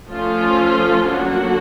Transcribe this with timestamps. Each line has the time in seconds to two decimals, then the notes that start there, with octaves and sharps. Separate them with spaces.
0.10 F3 A3 C#4 F4
1.10 D3 F#3 A#3 D4 F#4